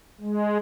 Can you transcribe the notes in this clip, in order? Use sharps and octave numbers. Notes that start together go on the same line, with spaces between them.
G#3